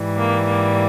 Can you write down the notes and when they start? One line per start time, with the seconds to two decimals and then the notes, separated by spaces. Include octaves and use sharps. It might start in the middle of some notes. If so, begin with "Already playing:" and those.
Already playing: G#2 E3 G3
0.15 A#3
0.46 A#3